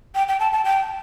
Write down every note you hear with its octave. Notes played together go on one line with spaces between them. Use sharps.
G5
G5
A5
A5
G5